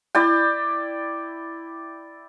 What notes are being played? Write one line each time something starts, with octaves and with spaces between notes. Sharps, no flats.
E4 D5 G5